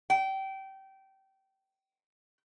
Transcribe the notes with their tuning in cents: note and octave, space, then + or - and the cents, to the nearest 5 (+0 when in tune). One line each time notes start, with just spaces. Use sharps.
G5 -25